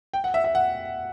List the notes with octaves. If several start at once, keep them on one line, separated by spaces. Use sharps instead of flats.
G5
F#5
E5
E5
F#5